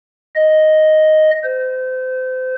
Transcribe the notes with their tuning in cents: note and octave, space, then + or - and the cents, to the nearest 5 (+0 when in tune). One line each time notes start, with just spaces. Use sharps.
D#5 +0
C5 -30